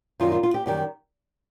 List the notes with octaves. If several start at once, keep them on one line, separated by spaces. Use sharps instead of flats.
F#2 D#3 G3 F4
F4
F4
G4
F#2 D#3 G3 G4